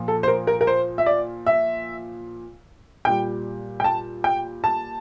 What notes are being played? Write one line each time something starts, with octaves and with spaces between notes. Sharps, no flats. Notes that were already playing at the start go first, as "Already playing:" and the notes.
Already playing: A#2 F3
A4
C5
A#4
A#4
A#4
C5
E5
D5
E5
A#2 G3 G5
G5
A5
G5
A5